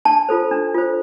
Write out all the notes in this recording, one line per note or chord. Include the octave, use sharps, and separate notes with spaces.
D4 A5
F4 A4 C5
D4
F4 A4 C5